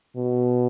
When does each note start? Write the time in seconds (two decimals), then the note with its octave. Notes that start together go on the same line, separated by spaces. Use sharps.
0.17 B2